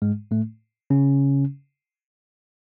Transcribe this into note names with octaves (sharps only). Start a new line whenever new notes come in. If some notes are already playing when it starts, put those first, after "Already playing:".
G#2 G#3
A2 A3
C#3 C#4